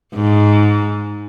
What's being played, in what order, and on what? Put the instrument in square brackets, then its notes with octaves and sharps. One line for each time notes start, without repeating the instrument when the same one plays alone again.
[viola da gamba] G#2